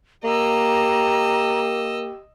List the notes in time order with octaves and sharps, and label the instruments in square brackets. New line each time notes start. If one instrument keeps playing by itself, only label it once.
[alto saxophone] A#3 [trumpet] G4 [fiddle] D#5 E6 [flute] A#5